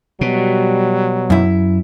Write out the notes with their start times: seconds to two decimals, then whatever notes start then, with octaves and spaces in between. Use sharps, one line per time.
0.21 B2 F#3 G3
1.30 F#2 E4